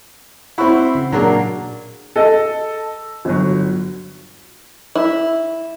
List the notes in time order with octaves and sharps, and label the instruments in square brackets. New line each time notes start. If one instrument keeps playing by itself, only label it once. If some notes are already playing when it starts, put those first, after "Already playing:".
[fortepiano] C4 E4 [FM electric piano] F#5 B5 C#6
[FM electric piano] C#3
[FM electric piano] A#2 G#4 [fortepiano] F#3 A#3 D4
[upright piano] A4 D#5
G1 F#3
[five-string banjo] E4